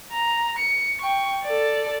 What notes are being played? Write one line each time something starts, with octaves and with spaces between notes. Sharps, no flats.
A#5
C#7
G5 C#6
A4 D5